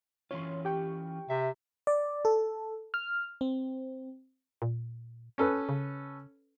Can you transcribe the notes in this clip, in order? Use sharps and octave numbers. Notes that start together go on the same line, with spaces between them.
E3 C#4 F4 C#5 C6
G4 G5 C#6
C3 E5
D5
A4
F6
C4
A#2
C#4 A4 B4
C#3